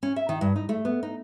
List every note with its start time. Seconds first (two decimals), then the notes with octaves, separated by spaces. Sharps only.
0.03 C#4
0.16 E5
0.29 D#3
0.41 G2
0.56 D#4
0.69 A3
0.85 B3
1.03 D#4